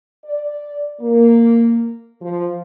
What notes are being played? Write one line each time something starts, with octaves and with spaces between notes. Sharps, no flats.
D5
A#3
F3